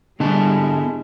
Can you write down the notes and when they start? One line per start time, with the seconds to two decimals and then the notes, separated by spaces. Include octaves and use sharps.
0.20 D3 G3 G#3 B3 E4 G4 A5